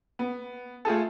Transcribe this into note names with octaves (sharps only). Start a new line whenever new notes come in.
B3
A3 F4 G#4 A4